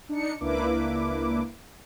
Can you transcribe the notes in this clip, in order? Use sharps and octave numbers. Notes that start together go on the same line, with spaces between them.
D4 D#4 C#7
C#2 A#3 D4 E4 B4 D6